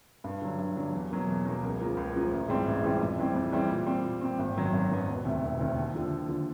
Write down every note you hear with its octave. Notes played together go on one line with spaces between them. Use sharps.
G2
D3 F#3
G2
D3 F#3
E2
B2 F#3 A#3
E2
B2 F#3 A#3
C#2
C#3 F3 A#3
C#2
C#3 F3 A#3
A1
G#2 E3 G3 C4
A1
G#2 E3 G3 C4
F2
C#3 E3 G3 C4
F2
C#3 E3 G3 C4
A#2
G3 C4
A#2
G3 C4
G#1
F#2 D#3 F#3 B3
G#1
F#2 D#3 F#3 B3
E1
D2 C3 D#3
E1
D2 C3 D#3
D#2
D3 F3
D#2
D3 F3